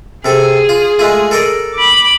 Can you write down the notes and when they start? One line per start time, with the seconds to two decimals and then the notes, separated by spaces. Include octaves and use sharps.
0.25 C3 G#4 A4
0.69 F4
0.99 G#3 A3 F4
1.31 A4 A#4 D5
1.75 B5 D6